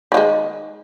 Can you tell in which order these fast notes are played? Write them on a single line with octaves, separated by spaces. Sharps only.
D#3 F#3 G#3